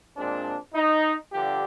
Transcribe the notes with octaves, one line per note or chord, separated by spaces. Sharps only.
A#2 G#3 C4 D4
D#4
G2 D3 F3 G4